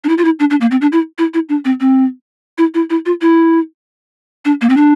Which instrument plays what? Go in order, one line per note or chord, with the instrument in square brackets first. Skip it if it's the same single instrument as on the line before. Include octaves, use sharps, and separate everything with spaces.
[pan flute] D4
E4
F4
E4
D4
D4
A#3
C4
D4
E4
E4
E4
D4
C4
C4
E4
E4
E4
F4
E4
D4
A#3
C4
D4